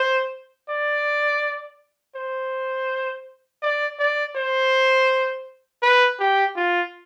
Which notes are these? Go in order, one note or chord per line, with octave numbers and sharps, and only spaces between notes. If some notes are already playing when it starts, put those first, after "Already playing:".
Already playing: C5
D5
C5
D5
D5
C5
B4
G4
F4